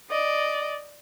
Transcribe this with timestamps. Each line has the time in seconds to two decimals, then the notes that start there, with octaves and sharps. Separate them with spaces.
0.10 D5 D#5